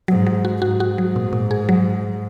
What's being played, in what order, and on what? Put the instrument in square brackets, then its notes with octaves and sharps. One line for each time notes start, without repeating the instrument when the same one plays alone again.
[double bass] G#2 [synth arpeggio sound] F#3
[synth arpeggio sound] F#3
F#4
[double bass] G#2 [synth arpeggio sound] F#4
[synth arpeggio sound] F#4
F#3
A#2
A#2
G#4
F#3